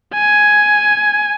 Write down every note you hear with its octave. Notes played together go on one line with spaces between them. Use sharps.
G#5